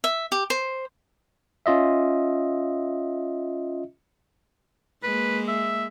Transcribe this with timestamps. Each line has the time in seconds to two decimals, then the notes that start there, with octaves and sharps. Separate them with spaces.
0.04 E5
0.32 G4
0.50 C5
1.66 C#4 F4 D#5 E5
5.03 G#3 A#3 B4
5.48 E5